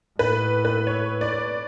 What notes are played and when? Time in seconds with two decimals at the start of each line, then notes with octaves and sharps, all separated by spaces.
0.19 A2 B4
0.65 B4
0.87 C#5
1.21 D5